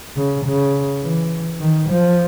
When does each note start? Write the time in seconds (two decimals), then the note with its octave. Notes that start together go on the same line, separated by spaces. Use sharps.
0.17 C#3
0.45 C#3
1.03 E3
1.60 D#3
1.89 F3